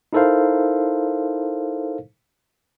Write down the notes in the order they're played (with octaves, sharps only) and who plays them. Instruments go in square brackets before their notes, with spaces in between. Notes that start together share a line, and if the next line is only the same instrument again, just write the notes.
[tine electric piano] D#4 E4 A4 A#4 C5 F5